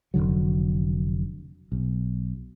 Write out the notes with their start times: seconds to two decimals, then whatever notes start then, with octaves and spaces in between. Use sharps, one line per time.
0.14 F1 D2 D3 F#3
1.72 B1